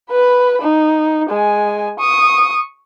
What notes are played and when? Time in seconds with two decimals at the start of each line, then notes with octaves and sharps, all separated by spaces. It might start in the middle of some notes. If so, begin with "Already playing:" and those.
0.10 B4 B5
0.62 D#4
1.29 G#3 G#5
1.99 C#6 D#6